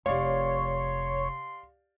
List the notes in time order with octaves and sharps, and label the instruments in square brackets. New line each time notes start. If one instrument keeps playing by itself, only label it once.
[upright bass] F1 C3 [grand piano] G4 D5 F5 [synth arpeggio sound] C#5 [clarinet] C6